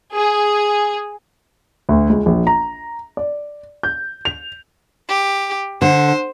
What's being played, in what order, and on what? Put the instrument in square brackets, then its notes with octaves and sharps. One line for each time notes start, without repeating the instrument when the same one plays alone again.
[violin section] G#4
[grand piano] D2
C#2
A#1
A#5
D5
G6
F7
[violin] G4
[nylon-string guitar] D3 [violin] C5